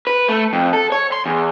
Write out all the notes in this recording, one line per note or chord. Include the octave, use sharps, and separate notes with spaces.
B4
A3
F2
A4
C#5
C6
E2